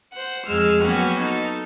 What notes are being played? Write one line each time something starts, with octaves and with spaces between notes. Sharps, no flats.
C5 F#5
F2 G#3 E6 F6
F#3 A#3 B3 C#4 F#4 G4
D#4 A4